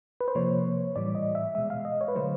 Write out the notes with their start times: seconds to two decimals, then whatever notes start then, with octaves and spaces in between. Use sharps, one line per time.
0.21 B4
0.28 C5
0.35 C3 F3 A#3 C#5
0.96 A2 E3 G3 D5
1.15 D#5
1.35 E5
1.55 B2 G#3 E5
1.70 F5
1.85 D#5
2.01 C#5
2.08 B4
2.15 D3 F#3 A3 C5